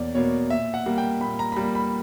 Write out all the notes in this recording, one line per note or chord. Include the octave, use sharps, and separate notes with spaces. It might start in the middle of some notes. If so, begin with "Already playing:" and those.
Already playing: E2 B2 A#3 C#5 D5
B2 A#3 C#5
A#2 E5
F#5
G3 A#3
G5
A#2 B5
A#5
B5
G3 A#3 A#5
B5